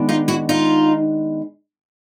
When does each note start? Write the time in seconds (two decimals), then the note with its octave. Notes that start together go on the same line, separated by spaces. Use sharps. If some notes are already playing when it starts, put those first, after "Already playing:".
Already playing: D#3 G#3 B3 D4
0.09 D#4 F4
0.28 E4 F#4
0.49 D#4 F4